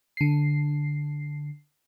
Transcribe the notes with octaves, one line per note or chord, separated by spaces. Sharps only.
D3 C7